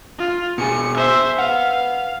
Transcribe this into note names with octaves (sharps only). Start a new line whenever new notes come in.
F4
B2 G#4 G#5 C#7
C5 E5
B4 F5 F#5